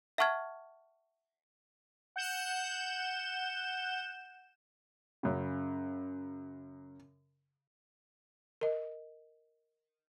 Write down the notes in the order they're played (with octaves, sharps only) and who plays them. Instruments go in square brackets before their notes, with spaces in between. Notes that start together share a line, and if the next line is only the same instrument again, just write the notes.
[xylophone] E5 F#5 A5 C#6 F6 G#6
[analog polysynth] F#5 G6 E7
[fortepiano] F#2 C#3
[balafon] A#4 D#5